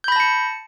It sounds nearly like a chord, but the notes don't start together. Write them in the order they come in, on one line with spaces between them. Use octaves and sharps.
G6 B5 A#6 A5 C#7